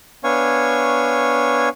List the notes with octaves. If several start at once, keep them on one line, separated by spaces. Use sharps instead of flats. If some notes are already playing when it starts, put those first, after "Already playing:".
B3 D4 C#5 F5 G#5 C#6